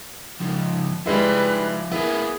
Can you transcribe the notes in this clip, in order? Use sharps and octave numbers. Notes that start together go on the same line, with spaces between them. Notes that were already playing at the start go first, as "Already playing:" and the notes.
C#2 F3
F3 G3 G#3 E4 B4 E5
A#3 B3 E4 G#4